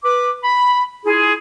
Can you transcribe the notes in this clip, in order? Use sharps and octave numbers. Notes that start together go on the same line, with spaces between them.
B4 D6
B5
E4 F4 G#4